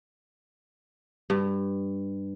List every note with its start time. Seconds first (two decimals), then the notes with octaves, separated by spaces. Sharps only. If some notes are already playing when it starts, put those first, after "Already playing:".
1.30 G2